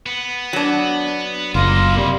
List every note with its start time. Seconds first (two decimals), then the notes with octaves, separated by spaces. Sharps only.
0.06 B3
0.53 F#3 D4
1.55 F#1 A#3 E4 F4 D#5 F5
1.97 C3 G3